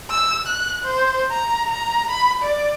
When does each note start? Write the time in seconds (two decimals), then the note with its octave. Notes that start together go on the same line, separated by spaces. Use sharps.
0.10 E6
0.47 F#6
0.84 C5
1.31 A#5
1.71 A#5
2.10 B5
2.42 D5